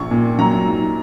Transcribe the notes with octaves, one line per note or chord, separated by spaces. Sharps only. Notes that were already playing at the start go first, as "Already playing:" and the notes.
Already playing: A#1 C#6
A#2
F#3 A#5
G#2